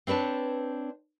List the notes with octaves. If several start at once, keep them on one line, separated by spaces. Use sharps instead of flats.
C4 D4 B4 C#5 A5